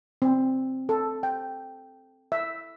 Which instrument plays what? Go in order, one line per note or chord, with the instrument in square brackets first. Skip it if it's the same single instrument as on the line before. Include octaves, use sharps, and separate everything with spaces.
[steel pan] C4
A4
G5
E5